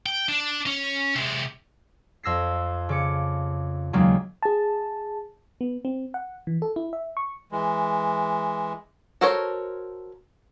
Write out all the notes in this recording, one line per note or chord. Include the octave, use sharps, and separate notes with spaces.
G5
D4
C#4
C3 G#3
F2 E6 A#6 C7
C#3 D6 C#7
D#2 C#3 F#3 G#3 A#3
G#4 A5
B3
C4
F#5
E3
A4
E4
E5
C#6
E3 G#3
F#4 A4 A#4 C5 C#5